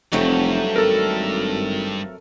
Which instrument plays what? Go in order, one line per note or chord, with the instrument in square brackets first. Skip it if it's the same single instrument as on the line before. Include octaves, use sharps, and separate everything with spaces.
[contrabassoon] F1 [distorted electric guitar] G2 [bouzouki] F#3 A3 C4
[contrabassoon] G#1 [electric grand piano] A4 A#4